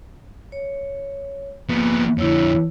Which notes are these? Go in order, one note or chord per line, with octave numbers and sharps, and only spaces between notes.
C#5
F3 A#3 B3
F2 D3 E4 C#5